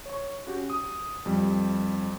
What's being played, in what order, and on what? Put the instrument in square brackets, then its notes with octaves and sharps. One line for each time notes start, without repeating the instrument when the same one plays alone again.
[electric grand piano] C#5 C#6
C#4 F#4 G4
D#6
F2 G3